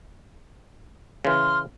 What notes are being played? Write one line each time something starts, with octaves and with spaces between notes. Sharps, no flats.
C#3 E3 C6 F6